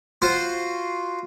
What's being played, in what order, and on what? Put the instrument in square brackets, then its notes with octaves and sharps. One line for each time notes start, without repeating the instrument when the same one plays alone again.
[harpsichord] F4 F#4 C5